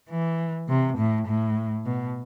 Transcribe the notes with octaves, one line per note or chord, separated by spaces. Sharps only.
E3
C3
A2
A2
B2